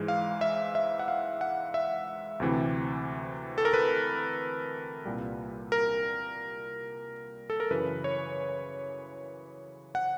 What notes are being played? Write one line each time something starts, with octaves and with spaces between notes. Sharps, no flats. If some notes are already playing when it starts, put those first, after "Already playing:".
Already playing: G#2 E3 G#3
F5
E5
E5
F#5
F5
F#5
E5
D2 C3 E3
A4
A#4
B4
C2 A#2 G3
A#4
A4
A#4
F#2 C#3 E3 B4
C#5
F#5